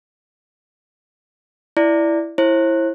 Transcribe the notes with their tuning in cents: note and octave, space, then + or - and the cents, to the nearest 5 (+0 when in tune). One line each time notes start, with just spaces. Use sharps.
E4 +5 D5 +0
E4 +5 C5 +45